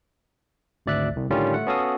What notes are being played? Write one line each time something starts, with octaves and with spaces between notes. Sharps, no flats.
G#1 D2 D5 E5 F#6
C2
A2 D3 D#3 G3 C#4 F4
A3 F#5
B3 C#4 F#4 A4 F5 D#6